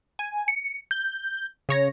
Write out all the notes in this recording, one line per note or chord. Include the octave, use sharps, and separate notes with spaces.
G#5
C#7
G6
C#3 C#5 A#6